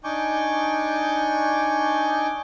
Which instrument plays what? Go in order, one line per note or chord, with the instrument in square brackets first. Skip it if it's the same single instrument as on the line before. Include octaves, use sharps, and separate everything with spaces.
[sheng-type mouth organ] D4 D#4 G#5 C#6 D6 G6